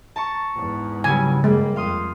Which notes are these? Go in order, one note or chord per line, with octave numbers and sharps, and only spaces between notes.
A5 A#5 C#6
E2 G#2
C#3 F#3 G3 G#5
G2 G3 G#3 A#3
F2 F5 C6 D#6